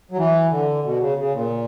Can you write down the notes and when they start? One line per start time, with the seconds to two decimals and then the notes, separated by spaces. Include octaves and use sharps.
0.11 F#3
0.17 E3
0.50 D3
0.83 B2
1.00 C#3
1.18 C#3
1.33 A#2